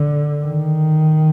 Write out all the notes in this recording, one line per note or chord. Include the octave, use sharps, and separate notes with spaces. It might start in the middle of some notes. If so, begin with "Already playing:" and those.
Already playing: D3
D#3